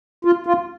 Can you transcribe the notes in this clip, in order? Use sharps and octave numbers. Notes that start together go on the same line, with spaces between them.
F4
F4